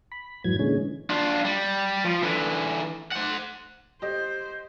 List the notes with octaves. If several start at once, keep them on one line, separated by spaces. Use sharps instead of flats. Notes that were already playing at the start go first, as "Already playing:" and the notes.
B5
F2 G#2 E3 F#3 G#6
A#2 D3 E3 G#3 C#4
D4 F4
G3
F3
D3 E3
C5 F#5
G4 C5 D#5